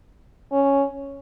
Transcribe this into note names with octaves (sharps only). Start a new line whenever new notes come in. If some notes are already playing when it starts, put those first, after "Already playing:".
C#4